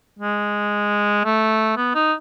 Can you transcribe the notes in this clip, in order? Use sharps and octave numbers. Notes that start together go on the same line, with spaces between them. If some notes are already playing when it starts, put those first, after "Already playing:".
G#3
A3
B3
D#4